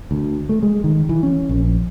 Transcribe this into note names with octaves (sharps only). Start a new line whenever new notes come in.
D2
A3
G#3
D#3
E3
C#4
A#1